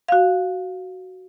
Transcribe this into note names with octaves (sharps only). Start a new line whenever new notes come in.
F#4 F5